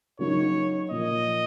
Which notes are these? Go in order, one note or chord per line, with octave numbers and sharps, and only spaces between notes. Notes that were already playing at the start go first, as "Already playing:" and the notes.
C#3 F#3 A#3 D#4 C#5
A#2 F3 A#3 D#5